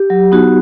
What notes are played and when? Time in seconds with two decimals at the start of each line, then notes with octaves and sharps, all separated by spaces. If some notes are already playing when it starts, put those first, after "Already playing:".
Already playing: G4
0.10 F#3
0.32 B3 D#4 F#4